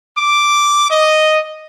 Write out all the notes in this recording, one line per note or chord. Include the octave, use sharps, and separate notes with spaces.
D6
D#5